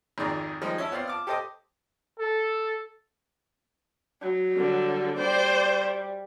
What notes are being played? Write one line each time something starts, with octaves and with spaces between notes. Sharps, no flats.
G#1 F2 D#3 G#4 D5 A#5
D#3 F3 G3 G#3 D#4 C5
C#4 E4 A5
B3 C4 D5 F5
A5 D6 F6
G4 A4 C5 D#5 D6 D#6
A4
F#3
D3 G3
G3 C5 D5